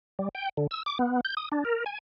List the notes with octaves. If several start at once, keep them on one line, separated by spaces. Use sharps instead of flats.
G3
G5
D3
E6
D6
B3
G6
D#6
D4
A#4
G#5